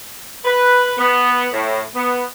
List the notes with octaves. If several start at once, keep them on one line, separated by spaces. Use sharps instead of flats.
B4
B3
A2
B3